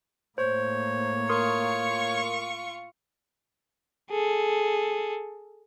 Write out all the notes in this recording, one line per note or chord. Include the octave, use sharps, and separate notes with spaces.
A2 A#3 C5 C#5
F4 A#4 C6 C#6 D#6
G#4 A4